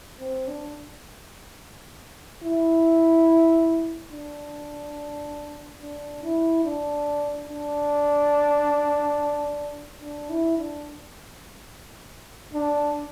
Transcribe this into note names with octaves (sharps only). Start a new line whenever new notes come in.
C4
D4
E4
D4
D4
E4
D4
D4
D4
E4
D4
D4